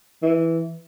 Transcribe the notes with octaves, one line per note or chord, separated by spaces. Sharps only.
E3